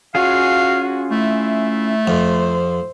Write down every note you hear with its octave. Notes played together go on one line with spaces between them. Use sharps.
C#4 F4 F#4 G#4 F5
A3 E4
F2 C5